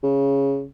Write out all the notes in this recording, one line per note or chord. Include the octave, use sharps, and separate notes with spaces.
C#3